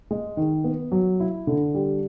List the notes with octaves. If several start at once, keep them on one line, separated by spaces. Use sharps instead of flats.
G#3
D#3
B3
F#3
E4
D3
G3